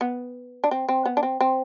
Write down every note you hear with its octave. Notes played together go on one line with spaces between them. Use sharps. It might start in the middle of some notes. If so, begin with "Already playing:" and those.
B3
D4
C4
C4
B3
D4
C4
C4